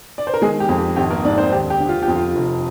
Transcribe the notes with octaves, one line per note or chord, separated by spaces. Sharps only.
D5
C5
A#4
D#3 G#3 G#4
G4
F2
G4
G#1 G4
A#3 A#4
G#2 D4 D5
C4 C5
D#2 G4
G4
D3
F4
G4
F2
F4
F1